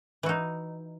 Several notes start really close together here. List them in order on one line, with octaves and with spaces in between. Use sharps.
E3 F#4 D#4